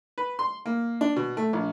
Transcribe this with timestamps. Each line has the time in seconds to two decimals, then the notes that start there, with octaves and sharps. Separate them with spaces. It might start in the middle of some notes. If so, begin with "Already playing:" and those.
0.18 B4
0.39 C6
0.66 A#3
1.01 D4
1.16 B2
1.37 A3
1.53 A#1